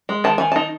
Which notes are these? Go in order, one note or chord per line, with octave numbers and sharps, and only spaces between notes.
G#3
D#3 A5
D#3 G#5
D#4 A5